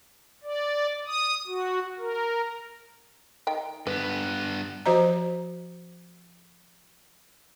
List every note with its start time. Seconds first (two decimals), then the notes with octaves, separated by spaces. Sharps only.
0.43 D5
1.07 D#6
1.47 F#4
1.98 A#4
3.47 D#3 D#4 G5
3.87 G2 B3 B4
4.86 F3 F#4 C5 D#5 A#5